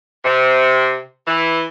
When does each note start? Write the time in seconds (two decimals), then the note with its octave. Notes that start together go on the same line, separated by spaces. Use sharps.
0.25 C3
1.27 E3